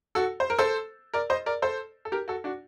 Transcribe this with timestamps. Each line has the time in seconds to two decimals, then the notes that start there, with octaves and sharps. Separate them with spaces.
0.15 F#4 A4
0.40 C5
0.50 A#4
0.59 A4 C5
1.14 A#4 D5
1.30 C5 D#5
1.46 A#4 D5
1.62 A4 C5
2.05 A4
2.12 G4 A#4
2.28 F#4 A4
2.44 D4 F#4